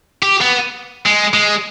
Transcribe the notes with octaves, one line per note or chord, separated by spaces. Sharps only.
G4
B3
G#3
G#3